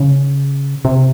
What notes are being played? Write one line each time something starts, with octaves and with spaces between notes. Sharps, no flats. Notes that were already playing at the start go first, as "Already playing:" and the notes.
Already playing: C#3
C3